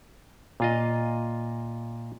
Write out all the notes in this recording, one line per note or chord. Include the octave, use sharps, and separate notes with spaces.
A#2 F4 D#5